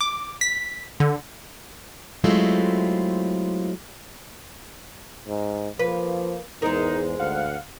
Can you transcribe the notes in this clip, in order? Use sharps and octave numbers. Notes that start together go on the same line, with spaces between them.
D6
B6
D3
F#3 G#3 A3 C4 E4 F4
G#2
F3 A#3 B4
E2 G#2 G#3 D#4 A#4
D2 F5 F#5